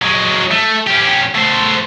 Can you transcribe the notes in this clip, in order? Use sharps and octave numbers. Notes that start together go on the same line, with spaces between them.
F#3 G#3
A3
C#4 G4
A3 C5